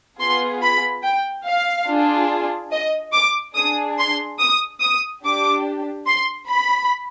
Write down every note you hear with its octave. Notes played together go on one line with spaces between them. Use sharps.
B3 F4 G#4 C6
B5
G5
F5
D4 F4 G#4
D#5
D6
D4 G#4 D#6
C6
D#6
D#6
D4 G4 D6
C6
B5